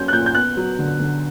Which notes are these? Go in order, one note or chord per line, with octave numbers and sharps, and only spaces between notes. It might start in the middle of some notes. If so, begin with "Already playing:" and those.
Already playing: F#3 A#3 C#4 G6
F#6
A#2 G6
G6
B3 F#6
F#3
D3
D3